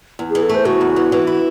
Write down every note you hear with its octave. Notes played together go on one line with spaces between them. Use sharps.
E2
E3 G#4
A4
A3 C5
C#3 F#4
E2
E3
E3
E4